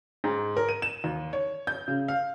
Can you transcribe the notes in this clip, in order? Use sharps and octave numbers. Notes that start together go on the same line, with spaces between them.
G#2
A#4
D#7
E7
D#2
C#5
G6
C#3
F5